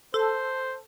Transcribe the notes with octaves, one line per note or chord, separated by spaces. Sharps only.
A4 C5